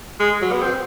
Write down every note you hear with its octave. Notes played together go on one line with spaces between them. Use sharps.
G#3
F#3
B3
C4